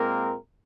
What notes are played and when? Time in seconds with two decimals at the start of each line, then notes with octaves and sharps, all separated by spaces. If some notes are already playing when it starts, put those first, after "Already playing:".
Already playing: A#2 G#3 A#3 C4 A#4